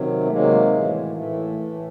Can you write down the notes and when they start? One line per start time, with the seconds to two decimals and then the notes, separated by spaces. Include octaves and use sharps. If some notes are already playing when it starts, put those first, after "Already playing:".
Already playing: C3 D#3 F#3
0.26 A3
0.31 C3 D#3 F#3 G#3 A#3
0.73 A2 E3
1.16 A2 E3 A3
1.59 A2 E3